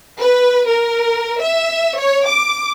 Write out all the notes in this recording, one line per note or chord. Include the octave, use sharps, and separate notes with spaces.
B4
A#4
E5
C#5
D6